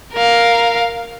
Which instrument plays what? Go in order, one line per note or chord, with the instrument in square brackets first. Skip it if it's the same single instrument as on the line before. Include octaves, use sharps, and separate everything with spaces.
[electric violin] A#4 F5